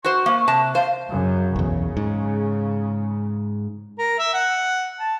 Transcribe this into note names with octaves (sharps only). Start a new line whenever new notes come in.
F#4 C5 C#6
A#3
C3 A5
C5 F5
F#2 C#3
B1 E2 C#3
G#2
A#4
E5
F#5
A5